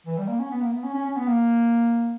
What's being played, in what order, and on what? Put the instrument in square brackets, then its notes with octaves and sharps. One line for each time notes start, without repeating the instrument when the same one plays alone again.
[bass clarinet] E3
G3
A#3
C#4
B3
A#3
B3
C#4
C#4
C#4
B3
A#3